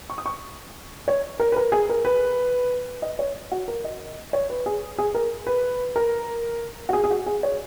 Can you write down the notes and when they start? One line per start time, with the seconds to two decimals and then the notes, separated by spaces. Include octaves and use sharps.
0.10 C#6
0.18 D#6
0.26 C#6
1.08 C#5
1.40 A#4
1.52 B4
1.56 A#4
1.72 G#4
1.89 A#4
2.05 B4
3.02 D#5
3.19 C#5
3.52 F#4
3.68 A#4
3.84 D#5
4.33 C#5
4.50 B4
4.66 G#4
4.98 G#4
5.15 A#4
5.47 B4
5.96 A#4
6.89 F#4
6.93 G#4
7.04 G#4
7.11 F#4
7.26 G#4
7.43 C#5